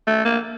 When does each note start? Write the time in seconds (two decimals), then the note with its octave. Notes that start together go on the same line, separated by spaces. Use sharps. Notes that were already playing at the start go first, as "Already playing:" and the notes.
0.07 A3
0.25 A#3